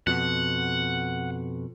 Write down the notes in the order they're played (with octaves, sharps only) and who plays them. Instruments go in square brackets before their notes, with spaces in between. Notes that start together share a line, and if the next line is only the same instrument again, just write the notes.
[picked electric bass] F2 B2 [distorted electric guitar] F#5